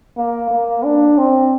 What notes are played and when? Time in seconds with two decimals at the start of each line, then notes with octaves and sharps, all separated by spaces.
0.18 A#3
0.51 A#3
0.84 D4
1.18 C4